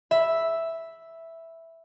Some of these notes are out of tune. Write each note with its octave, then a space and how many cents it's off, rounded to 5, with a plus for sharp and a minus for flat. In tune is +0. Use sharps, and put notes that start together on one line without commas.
E5 +0 B5 +0